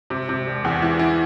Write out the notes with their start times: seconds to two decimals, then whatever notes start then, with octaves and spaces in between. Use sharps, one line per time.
0.10 C3
0.29 C3
0.46 E1
0.64 E2
0.82 E3
0.99 E3